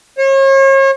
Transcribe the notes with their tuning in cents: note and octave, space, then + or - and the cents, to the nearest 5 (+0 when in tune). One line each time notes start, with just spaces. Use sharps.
C#5 -40